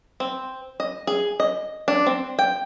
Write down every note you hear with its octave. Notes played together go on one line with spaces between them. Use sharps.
C4
D#5
G#4
D#5
D4
C4
G5